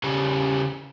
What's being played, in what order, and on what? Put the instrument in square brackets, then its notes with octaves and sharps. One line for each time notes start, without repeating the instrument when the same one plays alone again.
[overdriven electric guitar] C#3 G3